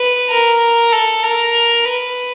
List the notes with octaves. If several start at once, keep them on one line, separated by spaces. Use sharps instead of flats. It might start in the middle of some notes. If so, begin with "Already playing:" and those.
Already playing: B4
A#4
A4
A#4
B4